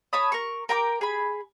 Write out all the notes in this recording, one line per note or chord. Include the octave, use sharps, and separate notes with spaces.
C#5 A5 B5 D#6
A#4 C#6
A#4 G5 A#5 D6
G#4 B5